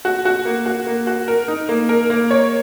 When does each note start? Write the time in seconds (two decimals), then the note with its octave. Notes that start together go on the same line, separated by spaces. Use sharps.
0.05 F#4
0.25 F#4
0.45 A#3
0.66 F#4
0.86 A#3
1.07 F#4
1.28 A#4
1.48 D#4
1.69 A#3
1.89 A#4
2.10 A#3
2.31 C#5